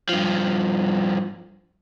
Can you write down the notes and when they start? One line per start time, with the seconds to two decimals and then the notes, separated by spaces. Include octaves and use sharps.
0.09 G2 F3